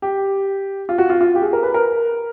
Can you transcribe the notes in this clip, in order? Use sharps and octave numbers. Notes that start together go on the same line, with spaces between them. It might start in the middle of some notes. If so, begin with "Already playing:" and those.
G4
F4
F#4
F4
F4
G4
G#4
A#4
B4
A#4